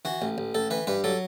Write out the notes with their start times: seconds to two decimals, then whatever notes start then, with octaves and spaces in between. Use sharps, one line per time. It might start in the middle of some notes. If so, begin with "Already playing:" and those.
0.05 E3 F#4
0.22 A1
0.38 A1
0.55 A1 A4
0.70 E3 B4
0.87 G2 B4
1.04 F#3 A4